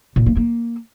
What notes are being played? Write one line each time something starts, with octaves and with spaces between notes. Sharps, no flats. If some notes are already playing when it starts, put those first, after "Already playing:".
A#2
A#3
A#3